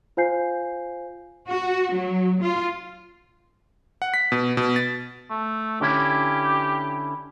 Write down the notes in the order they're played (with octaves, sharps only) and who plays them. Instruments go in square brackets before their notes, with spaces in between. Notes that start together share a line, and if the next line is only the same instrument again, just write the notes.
[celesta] F4 C5 F5 G#5 G6 C7
[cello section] F#4
F#3
F4
[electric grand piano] F#5
B6
B2
B2
A6
[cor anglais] A3
[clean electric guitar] D3 C#4 E4 [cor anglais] G4